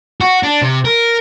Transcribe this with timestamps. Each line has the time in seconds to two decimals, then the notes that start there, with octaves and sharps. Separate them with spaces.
0.21 F#4
0.43 D4
0.62 C3
0.85 A#4